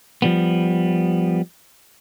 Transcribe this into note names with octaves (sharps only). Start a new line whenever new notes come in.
F3 G3 B3